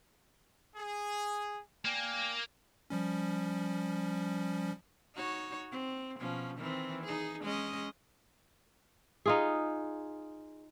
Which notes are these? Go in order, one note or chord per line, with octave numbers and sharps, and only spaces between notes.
G#4
A#3 D5 G5 G#5
F3 G3 C#4
D#4 F#4 C#5
C4
B2 F3 C#4
D#3 E3 C4
D#4 G#4
G#3 C#4 D#5
D#4 F4 G#4